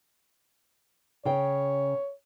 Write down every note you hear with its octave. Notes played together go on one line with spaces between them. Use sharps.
C#3 C#5 G5